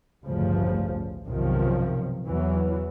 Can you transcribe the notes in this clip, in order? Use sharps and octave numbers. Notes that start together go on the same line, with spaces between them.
A1 D2 G2 C#3 F3
B1 F#2 C3 D#3 F3
E2 E3 F#3